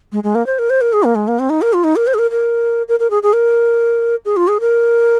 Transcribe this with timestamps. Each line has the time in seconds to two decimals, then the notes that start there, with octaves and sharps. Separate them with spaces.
0.12 G#3
0.24 G#3
0.35 A#3
0.46 C5
0.59 A#4
0.70 C5
0.81 A#4
0.93 G#4
1.04 A#3
1.15 G#3
1.28 A#3
1.39 C4
1.50 D#4
1.62 A#4
1.73 F4
1.84 D#4
1.96 A#4
2.07 C5
2.14 G#4
2.19 A#4
2.31 A#4
2.88 A#4
3.00 A#4
3.10 G#4
3.23 G#4
3.33 A#4
4.25 G#4
4.37 F4
4.48 G#4
4.60 A#4